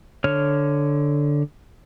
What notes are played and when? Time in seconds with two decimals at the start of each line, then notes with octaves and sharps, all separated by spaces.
0.24 D3 C#5 F6